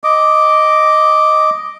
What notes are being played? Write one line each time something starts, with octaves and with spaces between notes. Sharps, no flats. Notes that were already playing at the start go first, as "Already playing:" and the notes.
D#5 D6